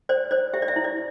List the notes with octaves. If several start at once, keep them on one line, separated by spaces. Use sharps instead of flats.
C5 D5
C5 D5
G4 E5
D5
E5
E4
D5